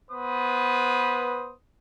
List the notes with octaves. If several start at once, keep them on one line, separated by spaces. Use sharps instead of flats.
B3 B4 C5 D#6